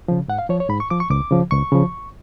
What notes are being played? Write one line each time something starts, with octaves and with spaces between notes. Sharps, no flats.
C#3 F3
G#2 F#5
F5
F3 C#5
C#5
G#2 B5
C#6
F3 D6
C#6
C#2 D6
C#3 F3
C#2 C#6
C#3 F3